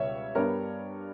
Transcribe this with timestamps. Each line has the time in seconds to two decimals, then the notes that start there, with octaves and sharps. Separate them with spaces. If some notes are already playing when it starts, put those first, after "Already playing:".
Already playing: C#2 B2 G3 C#5 E5
0.35 G2 G3 B3 A#4 C#5